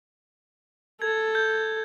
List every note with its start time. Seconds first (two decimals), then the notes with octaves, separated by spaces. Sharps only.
1.02 A4 G#6
1.35 G6